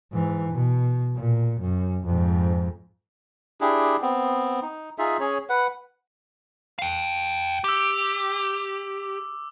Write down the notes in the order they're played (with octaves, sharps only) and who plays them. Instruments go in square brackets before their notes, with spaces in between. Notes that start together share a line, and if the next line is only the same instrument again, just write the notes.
[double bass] G#2 E3
B2
A#2
F#2
F2 G#2
[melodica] D4 E4 G4 G#4
B3 C4
D#4
D#4 F4 G#4 E5
C#4 G#4 C#5
B4 F#5
[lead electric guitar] F5 G5
[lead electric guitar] G4 [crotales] D6 E6